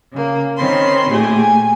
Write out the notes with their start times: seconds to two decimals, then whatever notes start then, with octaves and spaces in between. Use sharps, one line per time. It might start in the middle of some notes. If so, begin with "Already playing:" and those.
0.12 C#3 A#3
0.56 D#3 C4 C#4 B5 C6
1.11 A#2 A3 G4 G#4
1.40 G#5